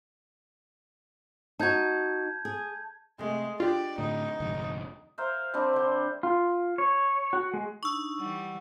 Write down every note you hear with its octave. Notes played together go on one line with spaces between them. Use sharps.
D#4 F#4 A5 G6 G#6
G#4
C3 G#3 A3
D4 F4 G4 D5
A2 D3 D#4
F1 D2 G#2
A#4 C5 E5 F5
G3 C4 D4
D3 C5
F4
C#5
F#4
G#3
D4 D#4 C#6 E6
E3 G3 F#5